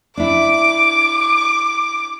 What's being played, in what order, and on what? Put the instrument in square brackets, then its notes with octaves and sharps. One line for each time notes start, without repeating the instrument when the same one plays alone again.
[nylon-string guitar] D4 E4 [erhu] D6